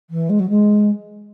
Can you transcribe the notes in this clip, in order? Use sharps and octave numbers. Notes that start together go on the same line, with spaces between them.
E3
G#3
F#3
G#3